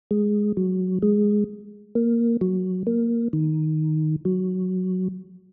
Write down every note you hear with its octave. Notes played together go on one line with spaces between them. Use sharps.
G#3
F#3
G#3
A#3
F#3
A#3
D#3
F#3